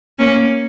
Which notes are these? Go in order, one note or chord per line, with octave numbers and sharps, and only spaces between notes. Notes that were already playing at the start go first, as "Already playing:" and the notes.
A#3 C#4